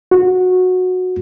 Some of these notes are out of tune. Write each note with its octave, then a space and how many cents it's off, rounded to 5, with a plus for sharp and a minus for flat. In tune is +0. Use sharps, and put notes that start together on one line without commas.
F#4 -15